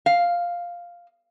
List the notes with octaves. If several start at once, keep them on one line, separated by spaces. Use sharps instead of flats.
F5